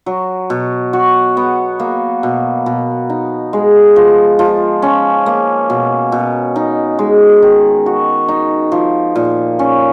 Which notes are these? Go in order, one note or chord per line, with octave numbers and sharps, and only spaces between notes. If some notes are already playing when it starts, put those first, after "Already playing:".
F#3
B2
F#4
B3
A#3
B2
B2
D#4
G#3
F3
F3
C#4
A#3
B2
B2
D#4
G#3
D#3
F#4
D#4
F3
A#2
C#4